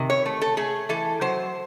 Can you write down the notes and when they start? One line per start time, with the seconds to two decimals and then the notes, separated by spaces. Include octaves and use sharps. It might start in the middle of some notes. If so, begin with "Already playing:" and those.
Already playing: C3 D#3
0.10 C#5
0.26 A3
0.41 A4
0.57 A3 G#4
0.89 E3 A4
1.21 F#3 C5